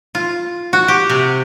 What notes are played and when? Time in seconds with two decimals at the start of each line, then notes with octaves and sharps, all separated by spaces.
0.15 F4
0.73 F#4
0.88 G4
1.10 C3